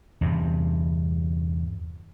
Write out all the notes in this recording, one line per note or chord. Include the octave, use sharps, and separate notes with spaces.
E2 G2 C3